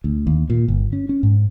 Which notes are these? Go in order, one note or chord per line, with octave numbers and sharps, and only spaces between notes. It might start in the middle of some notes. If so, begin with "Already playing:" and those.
D2
D#2
A#2
G1
C#4
C#4
G#2